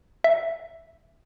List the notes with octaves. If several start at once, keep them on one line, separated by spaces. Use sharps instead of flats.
E5